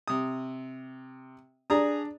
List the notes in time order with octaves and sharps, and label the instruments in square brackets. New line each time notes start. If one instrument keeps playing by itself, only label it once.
[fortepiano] C3 D#6
[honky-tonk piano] D4 [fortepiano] G#4 A#5 D#6